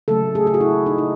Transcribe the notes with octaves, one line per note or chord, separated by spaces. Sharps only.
C#3 F#3 A3 A4
G#4
G#4
F#4
E4
D#4
D#4